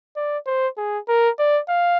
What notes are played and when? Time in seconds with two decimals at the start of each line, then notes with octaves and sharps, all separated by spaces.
0.16 D5
0.46 C5
0.77 G#4
1.08 A#4
1.39 D5
1.69 F5